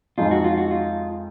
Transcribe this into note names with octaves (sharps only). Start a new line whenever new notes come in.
F2 F3 G#3 D#4 F4
F#4
F4
F#4
F4